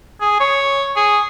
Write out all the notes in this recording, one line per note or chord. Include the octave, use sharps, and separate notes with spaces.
G#4
C#5
G#4